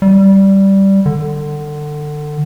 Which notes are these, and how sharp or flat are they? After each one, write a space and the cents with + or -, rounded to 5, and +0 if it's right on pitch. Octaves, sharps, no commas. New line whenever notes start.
G3 -10
D3 +25